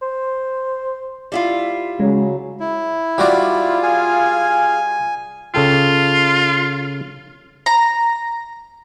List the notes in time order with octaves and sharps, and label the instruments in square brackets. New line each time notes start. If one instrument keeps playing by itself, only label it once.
[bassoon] C5
[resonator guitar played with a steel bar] G3 E4 F4
[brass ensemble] C#3 F#3 [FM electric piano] G#3
[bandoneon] E4
[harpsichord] G3 F#4 D5 [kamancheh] F4
[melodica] G#4 F5 [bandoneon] G#5
[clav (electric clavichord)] C#3 A4 G5 [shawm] F4
[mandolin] A#5